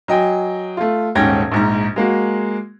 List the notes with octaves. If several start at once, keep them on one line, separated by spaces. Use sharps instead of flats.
F#3 D#5 G5 G#5
A3 F4
D#1 G#2 C#4 G5 G#6 A#6
A#1 G#2 A#5
G#3 A#3 F#4